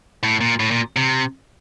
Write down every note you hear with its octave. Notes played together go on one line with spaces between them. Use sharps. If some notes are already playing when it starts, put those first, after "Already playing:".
A2
A#2
A2
A#2
C3